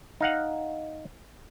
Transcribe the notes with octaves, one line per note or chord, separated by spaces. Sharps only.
D#4 F5 F#5